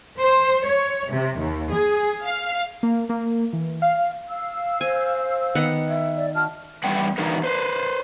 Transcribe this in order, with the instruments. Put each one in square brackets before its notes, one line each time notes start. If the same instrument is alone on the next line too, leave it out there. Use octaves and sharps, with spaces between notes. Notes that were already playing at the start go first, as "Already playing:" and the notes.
[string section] C5
C#5
C3
D#2
G#4
F5
[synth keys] A#3
A#3
E3
F5
[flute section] F5 E6
[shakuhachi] C5 [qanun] G#5
[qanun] D#3 B3 F#5
[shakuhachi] E5
[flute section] D5
[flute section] F#4 F6 [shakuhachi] A5
[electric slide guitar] E3 G3 B3 B4 F#5 G5
D3 E3 B3 D#4 F#4 A#4
B4 C5